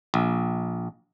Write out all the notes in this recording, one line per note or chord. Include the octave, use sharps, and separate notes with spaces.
A#1